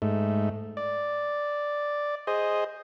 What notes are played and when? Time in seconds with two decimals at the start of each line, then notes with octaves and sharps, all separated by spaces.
0.02 G#2 A3
0.77 D5
2.27 G#4 C5 D#5